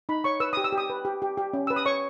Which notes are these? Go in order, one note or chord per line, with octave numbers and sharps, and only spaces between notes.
D#4 B5
C#5 C#6
B4 E6
D#6
G4
E6
G4
D#6
B4
G4
G4
G4
C#4
B4 E6
D#6
C#5 C#6